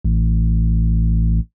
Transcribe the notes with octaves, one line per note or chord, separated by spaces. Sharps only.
A1